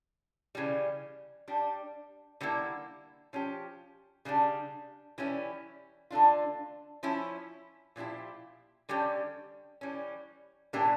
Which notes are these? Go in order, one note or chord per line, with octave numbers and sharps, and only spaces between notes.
C#3 E3 G3
G3 D4 G4
D3 G3 A#3 E4
F3 C#4 G4
C#3 G3 D4 G4
E3 G3 C#4 E4
D3 A3 D4 F4
F3 C#4 E4
A#2 F3 C#4 E4 G4
D3 G3 C#4 G4
E3 G3 C#4
A2 E3 A#3 D4 G4